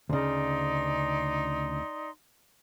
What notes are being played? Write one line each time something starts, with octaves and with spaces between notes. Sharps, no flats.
D2 C#3 D#4 D5 C6